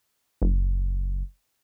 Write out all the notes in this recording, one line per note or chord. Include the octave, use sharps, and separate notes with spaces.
F#1